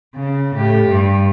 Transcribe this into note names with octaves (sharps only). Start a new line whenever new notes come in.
C#3
A2 G4
G2